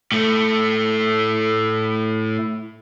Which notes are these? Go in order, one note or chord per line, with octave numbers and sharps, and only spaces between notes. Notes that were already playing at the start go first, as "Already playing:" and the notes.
A2 A3